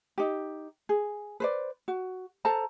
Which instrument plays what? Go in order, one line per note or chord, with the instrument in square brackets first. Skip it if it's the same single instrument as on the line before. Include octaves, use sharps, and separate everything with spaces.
[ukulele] D#4 G4
G#4
B4 C5 D5
F#4
A4 C5 A5 A#5